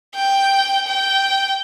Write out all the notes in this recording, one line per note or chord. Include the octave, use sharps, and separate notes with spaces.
G5
G5